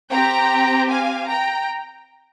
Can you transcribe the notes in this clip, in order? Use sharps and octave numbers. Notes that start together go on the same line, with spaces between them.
C4 G4 G5 A#5
F5 G#5
G5 A#5